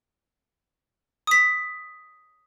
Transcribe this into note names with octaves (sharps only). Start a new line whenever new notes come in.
D#6 B6